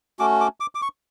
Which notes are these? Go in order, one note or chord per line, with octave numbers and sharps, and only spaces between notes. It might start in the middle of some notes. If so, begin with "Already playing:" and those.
A3 C#4 F#4 D6
D6
D6
D6
C#6